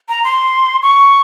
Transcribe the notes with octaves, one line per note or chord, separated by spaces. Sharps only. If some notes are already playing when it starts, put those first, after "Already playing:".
A#5
C6
C#6